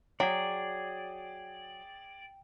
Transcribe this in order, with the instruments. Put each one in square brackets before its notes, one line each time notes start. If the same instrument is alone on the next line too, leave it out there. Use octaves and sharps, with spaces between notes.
[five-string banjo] F#3 [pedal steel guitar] G#4 D5 [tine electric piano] G5